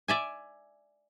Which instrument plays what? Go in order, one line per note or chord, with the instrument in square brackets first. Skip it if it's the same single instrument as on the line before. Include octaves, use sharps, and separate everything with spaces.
[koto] D5 E5 G#5